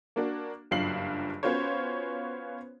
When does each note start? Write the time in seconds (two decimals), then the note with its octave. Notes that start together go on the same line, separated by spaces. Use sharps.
0.16 A#3 D4 F#4
0.71 F#1 G2 F#3 F4 C7 F#7
1.43 B3 C#4 F4 F#4 C5 C#5